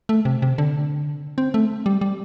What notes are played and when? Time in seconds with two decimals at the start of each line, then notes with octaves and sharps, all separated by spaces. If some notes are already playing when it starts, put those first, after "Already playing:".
0.09 A3
0.25 C3
0.42 C3
0.58 D3
1.38 C4
1.54 A3
1.86 G3
2.01 G3